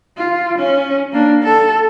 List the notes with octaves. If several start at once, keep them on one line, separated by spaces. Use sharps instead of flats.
F4
C#4
A#3 D4
A4